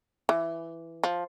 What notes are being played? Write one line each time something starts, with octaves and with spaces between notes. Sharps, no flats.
E3
F3